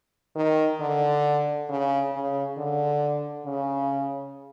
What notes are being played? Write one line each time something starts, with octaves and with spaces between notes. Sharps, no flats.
D#3
D3
C#3
C#3
D3
C#3